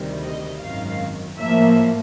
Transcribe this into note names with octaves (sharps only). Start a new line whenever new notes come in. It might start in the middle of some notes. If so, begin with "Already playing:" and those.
Already playing: D2 C3 D#3 G3
D#5
G#1 F#2 D#3 F5
A2 F3 A#3 E5